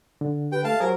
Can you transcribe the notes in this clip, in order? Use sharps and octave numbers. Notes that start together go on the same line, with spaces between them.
D3
G4 B4 G5
A3 F5 A5
F#3 G4 G#4 A#4 C5